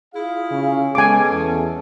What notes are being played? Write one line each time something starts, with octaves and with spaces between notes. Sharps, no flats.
E4 F4 G#4 F5
C#3
G#3 B3 C#4 A4 G#5 D6
E2